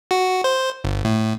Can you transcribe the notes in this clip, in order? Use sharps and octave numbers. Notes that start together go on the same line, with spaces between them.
F#4
C5
G1
A2